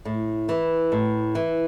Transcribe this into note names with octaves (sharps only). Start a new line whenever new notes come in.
A2
E3
A2
E3